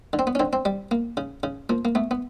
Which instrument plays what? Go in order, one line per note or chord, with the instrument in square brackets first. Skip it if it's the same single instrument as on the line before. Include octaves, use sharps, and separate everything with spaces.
[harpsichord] D3
C4
B3
C#4
D3 C4
C4
G3
A#3
C#3
C#3
F3 A#3
A#3
A3 B3
B3